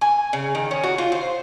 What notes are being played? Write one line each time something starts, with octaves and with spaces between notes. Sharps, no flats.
G#5
C#3
D#3
C#4
F#4
F4
C5